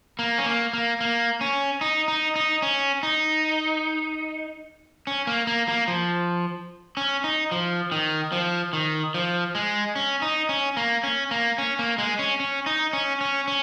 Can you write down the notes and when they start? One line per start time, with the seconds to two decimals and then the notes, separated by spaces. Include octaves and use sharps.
0.19 A#3
0.38 C#4
0.46 A#3
0.73 A#3
1.01 A#3
1.41 C#4
1.81 D#4
2.08 D#4
2.36 D#4
2.62 C#4
3.03 D#4
5.07 C#4
5.27 A#3
5.47 A#3
5.68 A#3
5.88 F3
6.97 C#4
7.24 D#4
7.51 F3
7.92 D#3
8.32 F3
8.73 D#3
9.14 F3
9.55 G#3
9.96 C#4
10.22 D#4
10.49 C#4
10.77 A#3
11.03 C#4
11.31 A#3
11.58 C#4
11.79 A#3
11.98 G#3
12.19 C#4
12.40 C#4
12.66 D#4
12.93 C#4
13.21 C#4
13.48 C#4